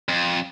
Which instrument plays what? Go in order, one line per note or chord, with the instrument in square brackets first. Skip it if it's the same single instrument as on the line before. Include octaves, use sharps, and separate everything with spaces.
[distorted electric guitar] F2